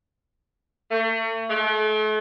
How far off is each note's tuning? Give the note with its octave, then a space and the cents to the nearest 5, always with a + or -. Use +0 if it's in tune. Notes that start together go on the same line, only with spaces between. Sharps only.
A3 +40
A3 -40